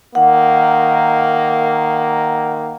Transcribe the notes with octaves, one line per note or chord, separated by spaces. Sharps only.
D#3 A#3 F#5